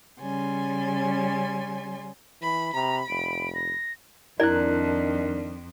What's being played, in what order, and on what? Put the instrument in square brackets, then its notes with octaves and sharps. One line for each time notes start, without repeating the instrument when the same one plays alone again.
[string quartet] C#3 G3 C#4 G#5 C6
[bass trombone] E3 [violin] B5
[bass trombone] C3 [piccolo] A#5 [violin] B5
[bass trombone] F1 [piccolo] D7
[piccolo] A#6
[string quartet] F2 [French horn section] D#3 D4 [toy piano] E4 D5 [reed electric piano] A#4 F#6